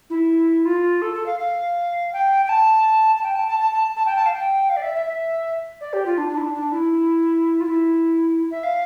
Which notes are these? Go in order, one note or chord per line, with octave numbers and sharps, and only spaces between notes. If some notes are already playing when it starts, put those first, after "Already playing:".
E4
F4
A4
A4
F5
F5
G5
G5
A5
A5
G5
A5
A5
A5
A5
A5
G5
A5
F5
G5
F5
D5
E5
E5
E5
D5
G4
F4
D4
D4
E4
D4
D4
E4
F4
E4
E5
F5